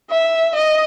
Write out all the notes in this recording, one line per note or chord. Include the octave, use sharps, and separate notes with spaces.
E5
D#5